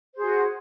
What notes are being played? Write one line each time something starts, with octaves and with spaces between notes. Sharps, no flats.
F#4 G#4 C5